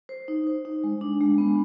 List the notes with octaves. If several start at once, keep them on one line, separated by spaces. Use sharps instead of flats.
C5
D#4
C5
D#4
G#3
D4
G#3
B3